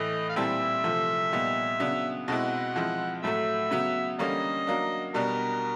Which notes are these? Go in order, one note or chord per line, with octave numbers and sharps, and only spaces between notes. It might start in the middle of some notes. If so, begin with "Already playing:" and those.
Already playing: A2 E3 A3 D#5
F5
A#2 G3 C4 E4 A4 E5
C3 F3 A3
A#2 G3 B3 D#4
C#3 F#3 B3 D4
B2 G#3 C4 E4 A4 D#5 F#5
F3 G#3 C4 E4
A2 F#3 A3 A4 E5
C#3 F#3 B3
D3 G3 A#3 C#4 A#4 D#5
F#3 A#3 D4
B2 G3 B3 D4 A#4